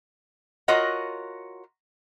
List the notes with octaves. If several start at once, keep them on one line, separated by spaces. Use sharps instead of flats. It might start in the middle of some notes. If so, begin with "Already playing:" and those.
F4 F#4 A#4 C#5 D#5 F#5